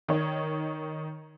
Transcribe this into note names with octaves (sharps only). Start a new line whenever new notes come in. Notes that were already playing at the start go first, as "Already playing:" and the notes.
D#3 C#5